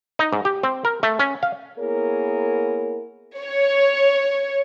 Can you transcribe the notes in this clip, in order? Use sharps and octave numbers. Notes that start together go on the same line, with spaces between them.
D#4
G#2
G4
C4
A#4
A3
C#4
F5
A#3 B3 E4 G#4 A#4 C#5
C#5